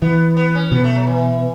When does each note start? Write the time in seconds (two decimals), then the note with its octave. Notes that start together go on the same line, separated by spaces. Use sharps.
0.02 E3 B3
0.37 B3
0.55 C#4
0.72 B2 B3
0.84 A3
0.95 F#3
1.07 E3